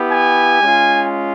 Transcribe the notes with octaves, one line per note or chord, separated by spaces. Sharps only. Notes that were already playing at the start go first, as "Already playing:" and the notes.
Already playing: B3 E4 G4
G#5
G#3 C#4 F4